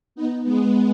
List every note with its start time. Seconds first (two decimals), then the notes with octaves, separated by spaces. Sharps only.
0.15 B3 D#4
0.43 G#3 B3